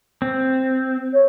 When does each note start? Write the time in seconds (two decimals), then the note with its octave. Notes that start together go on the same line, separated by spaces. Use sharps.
0.22 C4
1.13 C#5